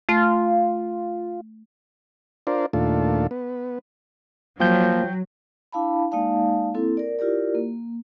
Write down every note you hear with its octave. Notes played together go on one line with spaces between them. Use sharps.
A3 F4
D4 F4 A#4 C5 D5
D#2 A#2 A3 D4 F4 A4
B3
F3 F#3 A#3 G5 G6
D4 E4 F5 A5 B5
G#3 A#3 D#4 D5 F5 A5
A#3 C4 E4 A4
A#4 D5
E4 F4 G4 A#4 D5
A#3